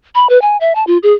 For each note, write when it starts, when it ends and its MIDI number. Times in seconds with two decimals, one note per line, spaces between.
0.15 0.27 83
0.29 0.41 71
0.42 0.57 80
0.60 0.73 76
0.75 0.84 81
0.87 0.98 65
1.03 1.13 68